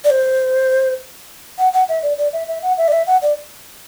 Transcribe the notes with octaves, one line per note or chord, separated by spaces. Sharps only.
D5
C5
F#5
F#5
E5
D5
D5
E5
E5
F#5
E5
D5
E5
F#5
D5